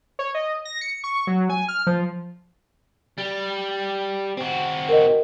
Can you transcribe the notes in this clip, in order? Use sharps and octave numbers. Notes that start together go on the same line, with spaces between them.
C#5
D#5
A#6
C#7
C#6
F#3
G#5
F6
F3
G3
C4 F#4
A#4 D#5